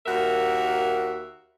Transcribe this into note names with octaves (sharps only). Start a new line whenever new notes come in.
D#2 F#4 A#4 E5